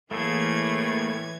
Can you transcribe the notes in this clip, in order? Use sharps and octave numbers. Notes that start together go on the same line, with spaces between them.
A2 E3 A3 A#3 G#4 G#6